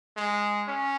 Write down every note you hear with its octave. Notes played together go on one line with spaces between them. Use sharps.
G#3
C#4